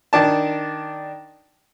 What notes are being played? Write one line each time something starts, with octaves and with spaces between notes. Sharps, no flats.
D#3 D4 A5